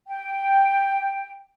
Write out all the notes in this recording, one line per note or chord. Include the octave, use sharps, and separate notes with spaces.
G5